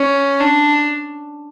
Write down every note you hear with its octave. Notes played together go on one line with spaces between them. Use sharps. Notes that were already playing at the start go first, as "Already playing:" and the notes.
Already playing: C#4
D4